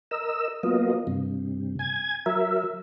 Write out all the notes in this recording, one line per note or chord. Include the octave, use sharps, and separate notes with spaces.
A#4 D#5 E6
F#3 A#3 B3 F4 D#5
G2 C3
G#5 G#6
F#3 A#4 E5